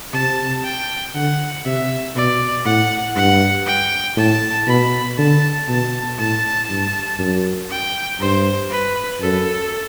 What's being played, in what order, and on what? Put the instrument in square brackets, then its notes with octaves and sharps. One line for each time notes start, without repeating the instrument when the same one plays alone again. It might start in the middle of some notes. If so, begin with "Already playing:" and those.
[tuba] C3 [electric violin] A5
[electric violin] G5
[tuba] D3 [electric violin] F#5
[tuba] C3 [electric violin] E5
[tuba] B2 [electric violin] D5
[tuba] A2 [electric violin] F#5
[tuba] G2 [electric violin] F#5
[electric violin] G5
[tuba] A2 [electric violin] A5
[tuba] B2 [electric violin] B5
[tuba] D3 [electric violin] A5
[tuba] B2 [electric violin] A5
[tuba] A2 [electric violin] A5
[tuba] G2
F#2
[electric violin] G5
[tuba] G2 [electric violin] C5
[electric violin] B4
[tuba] F#2 [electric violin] A4